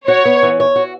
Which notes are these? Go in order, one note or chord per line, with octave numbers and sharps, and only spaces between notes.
F#4 C#5
B3
E3
C#5
F#4